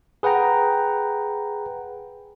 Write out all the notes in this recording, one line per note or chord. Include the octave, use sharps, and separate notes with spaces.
G#4 B4 F#5 G5 A#5